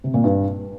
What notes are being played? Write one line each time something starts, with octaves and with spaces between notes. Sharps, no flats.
C3
A#2
G2